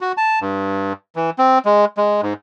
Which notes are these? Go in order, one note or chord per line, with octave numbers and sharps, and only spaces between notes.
F#4
A5
G2
E3
C4
G#3
G#3
G#2